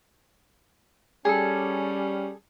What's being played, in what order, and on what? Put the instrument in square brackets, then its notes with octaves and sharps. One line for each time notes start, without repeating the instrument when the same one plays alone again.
[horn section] G3 C#4 [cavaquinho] G#4 A4